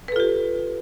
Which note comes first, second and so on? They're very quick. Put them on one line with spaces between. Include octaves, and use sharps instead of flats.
B4 A4 F4 G4